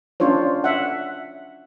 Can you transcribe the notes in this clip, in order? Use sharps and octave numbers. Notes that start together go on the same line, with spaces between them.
C#4 D4 F4 C5 C#5
E5 F#5